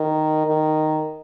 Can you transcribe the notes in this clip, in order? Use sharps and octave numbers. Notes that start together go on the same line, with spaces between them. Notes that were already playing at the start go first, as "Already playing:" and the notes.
Already playing: D#3
D#3